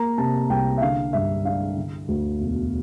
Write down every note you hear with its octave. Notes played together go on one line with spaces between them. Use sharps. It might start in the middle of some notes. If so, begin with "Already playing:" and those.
Already playing: A#3 A#5
C3 A5
C2 G5
E5
D3 F5
G2 E5
D4 F5
D3
D2
E1